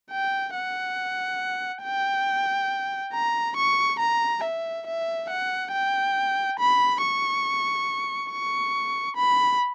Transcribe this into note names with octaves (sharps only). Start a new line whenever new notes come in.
G5
F#5
G5
A#5
C#6
A#5
E5
E5
F#5
G5
B5
C#6
C#6
B5